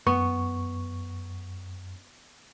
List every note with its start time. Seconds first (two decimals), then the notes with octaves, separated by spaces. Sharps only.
0.07 F#2 B3 C#6